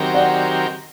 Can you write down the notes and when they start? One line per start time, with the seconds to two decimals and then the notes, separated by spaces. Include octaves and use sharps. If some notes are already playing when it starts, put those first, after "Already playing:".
Already playing: D#3 F#3 C4 G4 A#4
0.14 D5 F#5